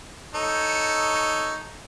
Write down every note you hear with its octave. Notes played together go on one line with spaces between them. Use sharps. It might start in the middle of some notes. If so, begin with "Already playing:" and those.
D#4 A4 C#5